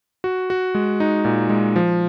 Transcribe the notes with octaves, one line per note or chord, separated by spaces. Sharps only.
F#4
F#4
G#3
D#4
A#2
G#3
F3